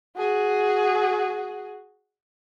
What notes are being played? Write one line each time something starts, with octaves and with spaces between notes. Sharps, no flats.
F#4 G#4